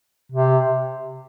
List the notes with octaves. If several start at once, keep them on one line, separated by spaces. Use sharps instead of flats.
C3